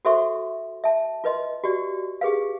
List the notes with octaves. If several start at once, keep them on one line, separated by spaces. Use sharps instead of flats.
F#4 A4 C5 E5 C6 C#6
E5 A5
F4 B4 D#5 C6
F#4 G4 D5
G4 G#4 B4 F5